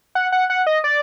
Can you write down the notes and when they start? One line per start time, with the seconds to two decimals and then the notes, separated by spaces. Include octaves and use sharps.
0.15 F#5
0.32 F#5
0.50 F#5
0.67 D#5
0.84 D5